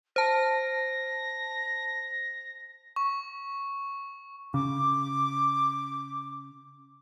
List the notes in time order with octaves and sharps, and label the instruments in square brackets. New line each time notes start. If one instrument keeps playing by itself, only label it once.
[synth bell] C5 A5 [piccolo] A#6
[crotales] C#6
[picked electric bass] C#3 [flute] D6